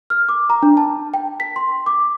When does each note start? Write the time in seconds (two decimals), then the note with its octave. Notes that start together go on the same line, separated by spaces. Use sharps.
0.10 F6
0.29 D6
0.50 A#5
0.63 D4
0.77 A5
1.14 G5
1.40 B6
1.56 C6
1.86 D6